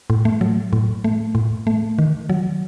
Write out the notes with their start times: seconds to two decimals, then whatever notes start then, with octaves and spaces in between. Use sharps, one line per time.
0.10 A2
0.25 A3
0.41 F#3
0.73 A2
1.04 A3
1.35 A2
1.67 A3
1.99 D#3
2.30 F#3